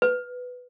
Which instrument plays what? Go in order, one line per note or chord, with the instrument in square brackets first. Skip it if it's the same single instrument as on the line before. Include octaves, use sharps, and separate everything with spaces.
[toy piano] B4